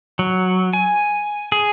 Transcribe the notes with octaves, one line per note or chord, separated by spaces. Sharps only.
F#3
G#5
G#4